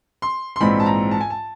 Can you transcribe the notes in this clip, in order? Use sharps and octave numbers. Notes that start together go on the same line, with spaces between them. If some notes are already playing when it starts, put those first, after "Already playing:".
C6
C6
A#1 G#2 E3 G#3 C4 B5
A5
A#5
A5
G#5
A5